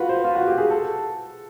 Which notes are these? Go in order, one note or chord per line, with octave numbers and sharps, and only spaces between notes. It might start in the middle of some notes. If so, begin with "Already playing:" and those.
Already playing: F4 F#4 B4
C5
F4
F#4
G4
G#4
A4